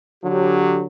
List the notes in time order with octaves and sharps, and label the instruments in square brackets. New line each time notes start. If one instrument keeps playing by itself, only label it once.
[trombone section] D3 F#3 [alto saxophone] G4